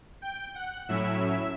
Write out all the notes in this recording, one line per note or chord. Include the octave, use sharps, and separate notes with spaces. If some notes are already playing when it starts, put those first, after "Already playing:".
G5 G6
F#5 F#6
A2 F#3 C#4 E4 E5 E6